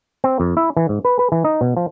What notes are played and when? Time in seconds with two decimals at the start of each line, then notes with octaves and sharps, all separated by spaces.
0.24 C4
0.40 F2
0.57 E4
0.77 E3
0.89 G#2
1.05 B4
1.19 B4
1.32 E3
1.44 D#4
1.61 B2
1.77 F3